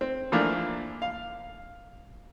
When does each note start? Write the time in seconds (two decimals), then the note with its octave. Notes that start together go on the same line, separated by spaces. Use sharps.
0.01 C4
0.32 E3 F3 A3 A#3 D4 F4
1.02 F5